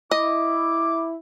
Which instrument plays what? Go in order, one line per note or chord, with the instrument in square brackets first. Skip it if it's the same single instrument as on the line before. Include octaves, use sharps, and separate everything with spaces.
[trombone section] E4 [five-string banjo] D#5 [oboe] D6